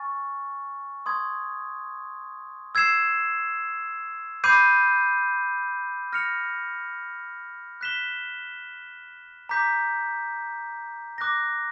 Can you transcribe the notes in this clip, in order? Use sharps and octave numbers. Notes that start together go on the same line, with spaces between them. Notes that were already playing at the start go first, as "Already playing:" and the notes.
Already playing: G#5 C#6 F6 A6
C6 D#6 G#6
E6 G#6 C7 E7
B5 D6 G6 C7 D#7
F6 A#6 C#7 F7
F#6 B6 E7 G7
A#5 D6 G6 B6
D6 F#6 A#6